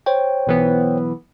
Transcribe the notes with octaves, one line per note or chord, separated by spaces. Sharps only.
C5 C#5 G5
B1 E3 B3